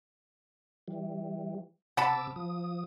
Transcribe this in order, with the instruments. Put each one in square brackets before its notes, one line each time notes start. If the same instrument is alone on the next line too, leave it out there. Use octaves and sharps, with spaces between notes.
[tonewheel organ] E3 G3
[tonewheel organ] C3 D6 E6 [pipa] F#5 A5 B5
[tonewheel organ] F3 D#6